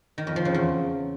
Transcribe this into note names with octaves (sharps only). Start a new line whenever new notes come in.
D#3
F2
F3
C#3
E2